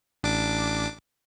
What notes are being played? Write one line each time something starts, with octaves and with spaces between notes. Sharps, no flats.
A1 D4 D6